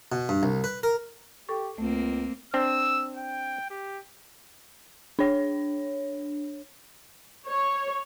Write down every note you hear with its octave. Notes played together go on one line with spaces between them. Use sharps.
B2
G2
C2
B4
A#4
G4 A4 C#6
C#2 A3 A#3 C4
C4 D4 E6
G5
G4
D4 C#5
C#5